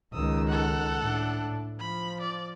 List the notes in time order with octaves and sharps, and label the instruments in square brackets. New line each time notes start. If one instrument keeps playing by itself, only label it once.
[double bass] C#2 D#3 [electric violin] D#6 E6
[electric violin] A4 F#5
[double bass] A2 D4
[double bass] F3 [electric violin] B5
[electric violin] D5